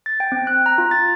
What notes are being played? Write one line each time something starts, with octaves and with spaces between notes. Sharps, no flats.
A6
G5
C4
F#6
A#5
F4
A6